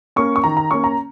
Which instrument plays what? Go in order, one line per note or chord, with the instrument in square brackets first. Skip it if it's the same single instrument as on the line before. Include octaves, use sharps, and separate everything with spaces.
[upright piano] A#3 C#4 C#6
C#6
D#3 A#5
A#5
A#3 C#4 C#6
A#5